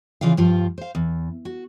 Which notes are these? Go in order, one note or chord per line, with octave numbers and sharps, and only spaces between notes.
C#3 E3 F4 D5 F5
G2 F3 F4
C5 F5
E2
F#4